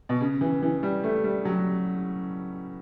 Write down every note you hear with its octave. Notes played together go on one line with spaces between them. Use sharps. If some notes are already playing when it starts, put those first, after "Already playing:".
B2
C#3
E3
E3
G3
A3
G3
F#3